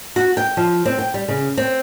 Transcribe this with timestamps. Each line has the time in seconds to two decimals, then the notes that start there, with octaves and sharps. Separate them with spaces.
0.16 F#4
0.37 G5
0.57 F3
0.86 C4
0.99 G5
1.14 G3
1.28 C#3
1.58 C4